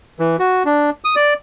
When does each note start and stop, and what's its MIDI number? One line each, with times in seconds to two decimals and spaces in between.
0.19 0.36 52
0.39 0.63 66
0.65 0.90 62
1.04 1.15 87
1.16 1.34 74